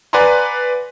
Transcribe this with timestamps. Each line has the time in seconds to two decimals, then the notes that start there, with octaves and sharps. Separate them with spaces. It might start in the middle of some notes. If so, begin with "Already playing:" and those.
0.13 B4 D5 F#5 G#5 A#5 C6